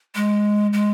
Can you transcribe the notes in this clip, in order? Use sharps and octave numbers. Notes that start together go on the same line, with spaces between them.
G#3
G#3